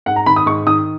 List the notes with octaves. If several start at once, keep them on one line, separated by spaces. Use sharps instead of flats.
G#2 F#5
A#5
D#3 B5
D#6
G#2 C#6
D#3 D#6